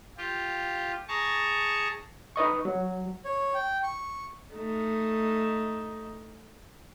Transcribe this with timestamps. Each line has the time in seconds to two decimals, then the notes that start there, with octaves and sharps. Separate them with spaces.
0.17 F4 G4
1.08 G#4 A5 A#5 C#6
2.36 D#4 B4 D#5 C#6
2.65 F#3
3.25 C#5
3.54 G5
3.83 C#6
4.54 A3 D#4